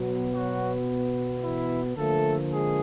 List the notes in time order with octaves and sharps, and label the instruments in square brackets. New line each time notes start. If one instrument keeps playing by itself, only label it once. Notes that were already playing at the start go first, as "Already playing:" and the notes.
Already playing: [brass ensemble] B2 F#3 B3
F#3 F#4
E3 E4
D3 F3 A3 A#3 A4
G#3 G#4